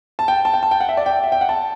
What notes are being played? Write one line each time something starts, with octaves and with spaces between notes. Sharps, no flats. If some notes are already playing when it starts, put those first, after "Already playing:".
A5
G5
A5
G5
A5
G5
F#5
E5
D5
G5
E5
G5
F#5
A5